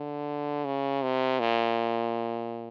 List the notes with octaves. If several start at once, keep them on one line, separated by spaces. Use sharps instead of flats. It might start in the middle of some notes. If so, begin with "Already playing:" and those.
Already playing: D3
C#3
C3
A#2